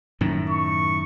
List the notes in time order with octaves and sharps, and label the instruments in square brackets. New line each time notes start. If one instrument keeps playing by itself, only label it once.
[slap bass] F#2 A2 D#3
[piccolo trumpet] C#6